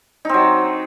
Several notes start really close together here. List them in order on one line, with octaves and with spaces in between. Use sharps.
D#4 C4 F#3